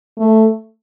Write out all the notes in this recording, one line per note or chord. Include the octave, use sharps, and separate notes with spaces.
A3